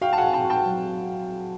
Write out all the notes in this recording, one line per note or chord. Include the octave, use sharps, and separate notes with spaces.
F#4 F5 G5
A5
F#5 G#5
F#4
G5 A5
F#4
G5 A5
F#3